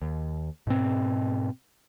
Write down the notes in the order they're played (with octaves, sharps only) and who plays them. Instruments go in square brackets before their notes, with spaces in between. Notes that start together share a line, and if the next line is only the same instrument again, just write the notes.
[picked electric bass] D#2
G#2 B2 C4